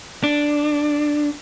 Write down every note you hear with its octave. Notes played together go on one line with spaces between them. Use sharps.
D4